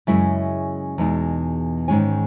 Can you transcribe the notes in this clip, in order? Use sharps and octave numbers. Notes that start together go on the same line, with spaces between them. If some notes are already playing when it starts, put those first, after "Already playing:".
F#2 C#3 G#3 C#4 E4 E5
E2 B2 G#3 D#4
G#2 D#3 G#3 C#4 G#5